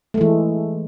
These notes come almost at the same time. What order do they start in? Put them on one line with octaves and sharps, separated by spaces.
A3 G#3 E3